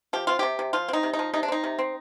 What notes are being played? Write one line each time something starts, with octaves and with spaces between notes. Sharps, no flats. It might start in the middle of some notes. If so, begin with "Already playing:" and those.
F3 G4
C4 F4
C3 G4
C3
F3 F4
C4 D#4
C3
D#4
F3
C3 D#4
D4
C4 D#4
C3
C4